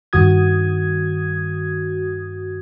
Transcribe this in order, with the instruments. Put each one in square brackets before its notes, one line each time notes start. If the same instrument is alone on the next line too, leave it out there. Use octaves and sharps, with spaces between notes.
[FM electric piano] G2 D#3 F#4 D#6 G#6